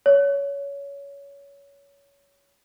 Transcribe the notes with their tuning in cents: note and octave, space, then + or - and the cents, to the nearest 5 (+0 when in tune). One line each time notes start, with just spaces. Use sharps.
C#5 +20